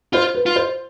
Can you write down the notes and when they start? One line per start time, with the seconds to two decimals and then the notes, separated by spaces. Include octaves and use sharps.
0.13 F4 C5
0.35 B4
0.46 F4
0.56 C5